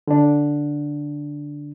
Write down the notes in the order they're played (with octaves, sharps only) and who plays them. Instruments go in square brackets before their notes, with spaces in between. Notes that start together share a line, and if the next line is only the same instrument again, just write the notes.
[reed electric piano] D3 D4